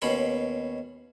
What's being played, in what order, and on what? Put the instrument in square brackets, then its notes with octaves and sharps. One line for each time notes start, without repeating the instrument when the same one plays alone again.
[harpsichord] D#2 B2 C#4 B5 C6